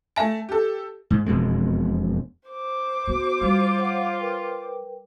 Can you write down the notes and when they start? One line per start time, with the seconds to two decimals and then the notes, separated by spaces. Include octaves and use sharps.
0.16 A3 E5 G#5 A5
0.49 G4 A4
1.10 G#2
1.26 E1 F2 B2 G#3
2.49 C5 D6
3.08 B3 F#4
3.41 G3 F4
3.77 C#5 F5 F#5
4.19 A#4 B4 G5